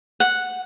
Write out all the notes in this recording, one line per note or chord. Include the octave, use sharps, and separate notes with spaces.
F#5